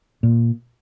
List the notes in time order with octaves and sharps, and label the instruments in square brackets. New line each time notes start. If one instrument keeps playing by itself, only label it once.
[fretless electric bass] A#2